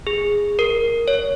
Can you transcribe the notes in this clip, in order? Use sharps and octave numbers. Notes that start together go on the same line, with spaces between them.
G#4
A#4
C#5